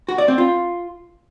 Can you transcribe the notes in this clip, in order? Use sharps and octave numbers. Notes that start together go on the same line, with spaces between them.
F#4
D5
C4
F4